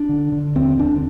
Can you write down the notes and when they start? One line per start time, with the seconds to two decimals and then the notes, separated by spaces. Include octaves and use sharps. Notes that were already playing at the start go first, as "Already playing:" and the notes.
Already playing: D4
0.09 D3
0.32 D3
0.55 D#2 C4
0.79 D3 D4